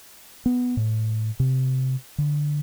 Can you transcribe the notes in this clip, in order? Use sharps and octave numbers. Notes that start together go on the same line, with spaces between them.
B3
A2
C3
D3